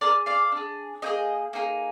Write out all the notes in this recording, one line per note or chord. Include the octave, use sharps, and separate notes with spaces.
D4 G#4 A#4 D5
D5 F5
D4
G#4
A#3 D#4 G#4 D#5 G5
A#3 D#4 G#4